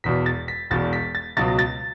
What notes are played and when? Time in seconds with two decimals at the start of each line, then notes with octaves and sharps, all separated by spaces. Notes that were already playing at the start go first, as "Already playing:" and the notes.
0.04 E1 E2 B2 B6
0.26 A6
0.48 B6
0.70 E1 E2 B2 A6
0.93 B6
1.15 A6
1.37 C#2 B2 F#3 A6
1.59 A6